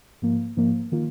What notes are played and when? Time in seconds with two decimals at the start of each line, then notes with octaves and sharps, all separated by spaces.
0.22 G#2 F3 A#3
0.57 G#2 F3 A#3
0.92 D#3 A#3 F4